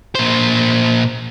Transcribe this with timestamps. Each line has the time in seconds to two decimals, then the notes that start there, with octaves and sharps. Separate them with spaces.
0.15 A#2 C5